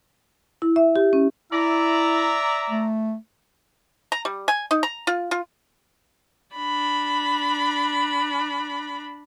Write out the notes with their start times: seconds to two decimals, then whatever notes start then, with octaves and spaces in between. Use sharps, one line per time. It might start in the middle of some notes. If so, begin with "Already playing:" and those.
0.62 E4
0.76 E5
0.96 G4
1.13 C#4
1.52 E4 D5 E5 A#5
2.70 A3
4.12 A#5
4.25 G3
4.48 G#5
4.71 D#4
4.83 A#5
5.07 F4
5.31 F4
6.55 D4 B5